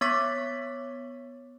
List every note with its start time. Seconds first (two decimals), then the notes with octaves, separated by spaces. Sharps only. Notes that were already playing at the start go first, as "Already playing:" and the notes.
0.01 B3 C#5 C#6 D6 A6 B6